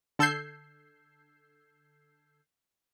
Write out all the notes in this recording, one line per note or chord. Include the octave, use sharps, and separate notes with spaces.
D3 A4 E6 G6 G#6 C7